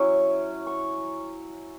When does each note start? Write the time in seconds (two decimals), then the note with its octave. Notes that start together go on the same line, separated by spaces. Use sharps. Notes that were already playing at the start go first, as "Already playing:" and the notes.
Already playing: F#3 C#4 E4 C#6
0.67 C#6